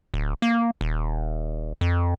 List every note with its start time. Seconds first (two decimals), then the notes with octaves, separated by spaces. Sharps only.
0.14 D1
0.42 A#3
0.81 D#1
1.81 F2